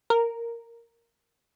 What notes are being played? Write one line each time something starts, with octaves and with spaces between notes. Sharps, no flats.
A#4